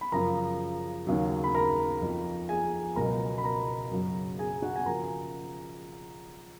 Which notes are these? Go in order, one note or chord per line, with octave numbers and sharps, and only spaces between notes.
B5
F#2 C#3 F3 A#4 A#5
D#2 C#3 F#3
B5
A#4 A#5
F2 F3
G#4 G#5
C#2 B2 F#3 A#4 A#5
B5
A#4 A#5
F#2 C#3 F#3
G#4 G#5
F#4 F#5
G#5
C#3 F3 A#4 A#5